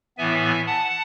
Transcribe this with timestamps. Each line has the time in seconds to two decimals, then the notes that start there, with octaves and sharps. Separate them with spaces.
0.18 A2 E3 B3 E5 G#5
0.66 F#5 A5